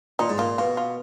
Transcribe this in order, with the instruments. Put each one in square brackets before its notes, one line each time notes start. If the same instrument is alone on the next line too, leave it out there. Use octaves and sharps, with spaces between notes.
[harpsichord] A#2 [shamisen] D#4
[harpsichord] G#2
[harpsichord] A#2 [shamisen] F4
[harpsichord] B2 [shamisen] F4
[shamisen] F4